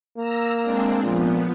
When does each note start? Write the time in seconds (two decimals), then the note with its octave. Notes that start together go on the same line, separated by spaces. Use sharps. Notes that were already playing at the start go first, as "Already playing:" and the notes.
0.17 A#3 A#5 E6 A#6
0.61 G#3 C4 D4
1.03 A#2 F3 B3